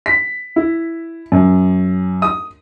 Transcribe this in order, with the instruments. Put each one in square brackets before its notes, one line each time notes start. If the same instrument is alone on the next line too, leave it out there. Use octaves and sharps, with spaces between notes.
[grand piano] B6
E4
F#2
D#6